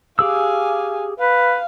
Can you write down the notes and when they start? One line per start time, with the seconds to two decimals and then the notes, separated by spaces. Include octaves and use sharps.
0.19 G4 G#4 F5 G#5 E6
1.20 B4 F5